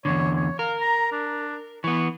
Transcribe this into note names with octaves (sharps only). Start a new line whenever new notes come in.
E2 G#2 D3 C#5
C#5
A#4 F5
A#5
D4
E3 B3 C#6